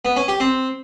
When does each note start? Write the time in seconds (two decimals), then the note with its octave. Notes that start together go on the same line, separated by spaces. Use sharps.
0.05 B3
0.17 C#4
0.28 G4
0.40 C4